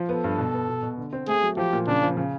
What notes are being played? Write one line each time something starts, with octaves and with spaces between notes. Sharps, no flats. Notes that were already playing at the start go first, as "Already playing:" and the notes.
Already playing: F3
B3 A4
G2
B2
B3
B2
B2
D3
C4
A3 G#4
F#3
F3 G4
A#2
C#3 D4
F3
C#3